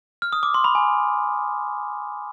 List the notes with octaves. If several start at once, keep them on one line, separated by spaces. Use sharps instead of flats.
F6
D#6
D6
C6
B5
G#5